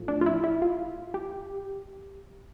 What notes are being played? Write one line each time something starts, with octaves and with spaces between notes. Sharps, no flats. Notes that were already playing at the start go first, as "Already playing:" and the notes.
Already playing: A2 F3
D4
F4
E4
E4
F4
G4